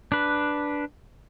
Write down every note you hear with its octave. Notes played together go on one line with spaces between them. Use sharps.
D4 B4